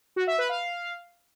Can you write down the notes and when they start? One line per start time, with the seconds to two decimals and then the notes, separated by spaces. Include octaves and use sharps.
0.16 F#4
0.27 E5
0.38 B4
0.49 F5